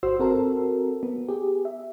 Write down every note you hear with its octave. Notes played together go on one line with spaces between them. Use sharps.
G1 F#4 C5 C6 E6
C4 F#4 A4 A#4
B3
G4 G#4
E5